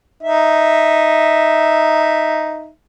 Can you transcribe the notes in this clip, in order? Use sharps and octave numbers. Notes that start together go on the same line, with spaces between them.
D#4 E5